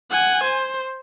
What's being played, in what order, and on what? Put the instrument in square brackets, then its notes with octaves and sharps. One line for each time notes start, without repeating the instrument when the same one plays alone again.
[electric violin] F#5 G#5
C5